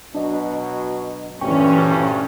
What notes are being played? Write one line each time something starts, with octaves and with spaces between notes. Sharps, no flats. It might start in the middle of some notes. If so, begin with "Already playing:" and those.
B2 F#3 D4 D#5
D2 G2 A#2 E3 C#4 G5 G#5 C#6